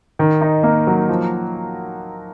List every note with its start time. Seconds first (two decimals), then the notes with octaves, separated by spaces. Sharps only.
0.19 D#3
0.41 D#4
0.63 A#3
0.87 F#3
1.09 F3